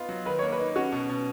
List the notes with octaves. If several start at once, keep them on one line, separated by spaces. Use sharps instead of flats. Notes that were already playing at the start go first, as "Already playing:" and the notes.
Already playing: B3 D#4 F4
F#3
D#3 B4
A#3 C#5
B4
D#4
C#4 F#4
B2
B2